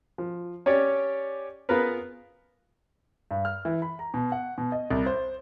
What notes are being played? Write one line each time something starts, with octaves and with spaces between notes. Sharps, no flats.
F3
C#4 G4 C#5 D5
B3 F4 G#4 A#4 B4
G2
F6
E3
B5
A#5
B2
F#5
B2
D#5
C2
C5